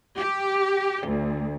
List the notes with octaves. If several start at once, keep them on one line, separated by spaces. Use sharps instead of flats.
G4
D2